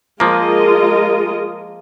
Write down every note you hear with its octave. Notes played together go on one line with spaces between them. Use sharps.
F3 G#3 A#3 F4 A#4 D#5